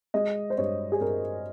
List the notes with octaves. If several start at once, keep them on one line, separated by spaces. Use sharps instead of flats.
G#3 D#5
C5
G2 C#5
G#4
G2 A#4